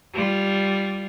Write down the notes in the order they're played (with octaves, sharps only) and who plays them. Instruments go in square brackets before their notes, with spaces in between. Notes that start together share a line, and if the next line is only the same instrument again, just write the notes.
[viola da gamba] G3 F4